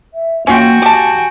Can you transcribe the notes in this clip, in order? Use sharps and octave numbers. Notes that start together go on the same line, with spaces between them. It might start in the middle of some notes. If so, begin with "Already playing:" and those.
E5
A#3 C#4 F4 F#4 G5
G4 G#5 A5